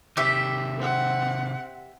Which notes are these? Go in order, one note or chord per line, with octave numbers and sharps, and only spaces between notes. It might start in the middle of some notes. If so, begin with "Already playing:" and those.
C3 D#3 G4 E5
C4 F#5